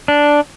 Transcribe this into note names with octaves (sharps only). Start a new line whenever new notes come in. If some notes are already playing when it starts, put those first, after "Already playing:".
D4